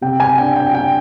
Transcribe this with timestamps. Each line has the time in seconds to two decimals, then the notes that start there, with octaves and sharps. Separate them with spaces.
0.01 C3 G5
0.20 G#5
0.38 D4 G5
0.56 G5
0.74 D4 G5